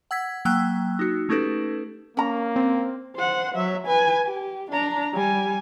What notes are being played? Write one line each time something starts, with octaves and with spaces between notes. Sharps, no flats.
F#5 E6 G#6 B6
F#3 A#3 G5 E6 F#6
D#4 F#4
A3 C#4 D#4 G4 A4 B4
A#3 C#4 A#5
C4
C5 F#5
F#3 E5
B4 G#5
G4
D4 A#5
G3 G#5